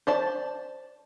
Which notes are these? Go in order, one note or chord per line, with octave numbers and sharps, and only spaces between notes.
C5 D5 A5